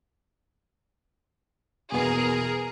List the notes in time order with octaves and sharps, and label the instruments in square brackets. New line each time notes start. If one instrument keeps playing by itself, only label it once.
[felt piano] E2 B2 [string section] G#4 A#4